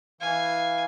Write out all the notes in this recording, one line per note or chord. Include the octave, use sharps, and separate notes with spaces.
E3 F5 G#5